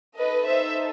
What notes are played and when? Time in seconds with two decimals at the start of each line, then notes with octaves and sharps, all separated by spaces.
0.17 D#4 A4 B4 D#5
0.45 C5 E5